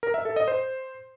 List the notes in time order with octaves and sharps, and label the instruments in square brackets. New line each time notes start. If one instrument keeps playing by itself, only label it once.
[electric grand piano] A#4
E5
A4
D#5
C5